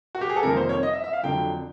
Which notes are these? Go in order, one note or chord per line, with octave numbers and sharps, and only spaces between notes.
F#4
G4
G#4
A4
F2 C3 D#3 G3 A#3 A#4
C5
C#5
D#5
E5
E5
F5
F2 D3 F#3 G5